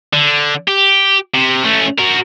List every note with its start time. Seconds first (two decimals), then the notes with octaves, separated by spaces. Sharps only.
0.13 D3
0.68 G4
1.34 C3
1.64 A3 C#4
1.99 F#4 A#4